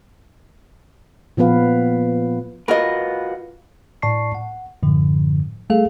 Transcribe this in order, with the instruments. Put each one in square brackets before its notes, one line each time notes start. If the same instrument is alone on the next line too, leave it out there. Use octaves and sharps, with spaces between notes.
[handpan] A#2 F3 B3 B4 F5
[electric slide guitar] F4 F#4 B4 [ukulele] A#4 D#5
[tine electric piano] A2 D5 A5 C#6 C7
F#5
F#2 A2 D3 F3
G3 A3 G#4 A4 F5